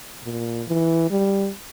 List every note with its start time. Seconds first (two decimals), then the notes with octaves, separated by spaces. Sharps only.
0.23 A#2
0.67 E3
1.11 G3